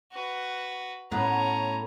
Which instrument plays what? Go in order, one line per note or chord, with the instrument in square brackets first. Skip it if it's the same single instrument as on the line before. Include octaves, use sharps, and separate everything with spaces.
[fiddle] F#4 B4
[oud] A2 B3 [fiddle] C#4 A#5